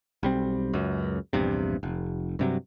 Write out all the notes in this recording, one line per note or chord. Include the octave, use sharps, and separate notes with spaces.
B1 G3 C4
C#2 F#2
A#1 E2 G2 C3
F1
G2 C3 F#3